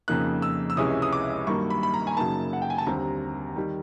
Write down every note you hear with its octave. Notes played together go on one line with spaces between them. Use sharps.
F2 C#3 F3 A#3 D#4 F#6
E6
E6
C#2 C3 E3 G#3 C#4 D#6
D#6
D6
G2 D#3 F#3 A#3 C#6
B5
B5
A#5
G#5
F#2 C#3 F#3 A#3 D#4 A5
F#5
G5
G#5
A5
D#2 D3 G3 C4 A#5
D#3 G3